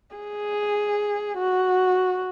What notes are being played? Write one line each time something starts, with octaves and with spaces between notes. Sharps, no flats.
G#4
F#4